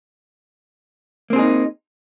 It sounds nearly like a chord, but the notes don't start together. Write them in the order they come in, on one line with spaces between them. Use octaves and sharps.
A#3 C4 G#4 D#4